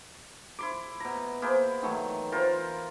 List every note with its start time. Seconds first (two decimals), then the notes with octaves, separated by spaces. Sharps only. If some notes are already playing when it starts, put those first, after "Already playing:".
0.59 E4 C6 D6
1.00 B2 A#5
1.42 A#3 E4 G#4 C5
1.83 D#3 E3 F#3 A3
2.32 E3 F4 A#4 C5